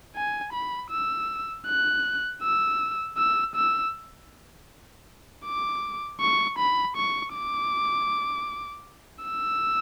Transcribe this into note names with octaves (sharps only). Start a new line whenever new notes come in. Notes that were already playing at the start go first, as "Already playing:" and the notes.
G#5
B5
E6
F#6
E6
E6
E6
D6
C#6
B5
C#6
D6
E6